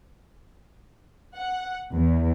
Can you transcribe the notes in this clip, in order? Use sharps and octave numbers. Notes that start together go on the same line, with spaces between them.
F#5
E2